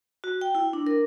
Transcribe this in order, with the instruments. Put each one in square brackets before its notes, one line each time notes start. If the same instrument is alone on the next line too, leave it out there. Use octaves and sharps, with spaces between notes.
[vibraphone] F#4
G5
E4
D4
A#4